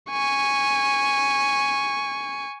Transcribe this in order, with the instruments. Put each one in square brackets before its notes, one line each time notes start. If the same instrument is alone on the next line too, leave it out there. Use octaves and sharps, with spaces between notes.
[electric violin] G#5 C#6